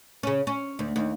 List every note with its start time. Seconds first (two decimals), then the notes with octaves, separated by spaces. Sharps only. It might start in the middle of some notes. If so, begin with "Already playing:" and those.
0.23 C#3 C#4
0.47 C#4
0.79 D2
0.96 D#2